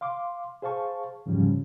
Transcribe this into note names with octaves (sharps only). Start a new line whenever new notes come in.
F5 C6 D6
G#4 C5 F5 A5 C#6
E2 G#2 C#3 F3 G3 C#4